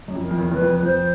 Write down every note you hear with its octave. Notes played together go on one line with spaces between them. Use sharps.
F#2
F2
A#4
F2
E2
E2 B4
F2
B4
F2 C5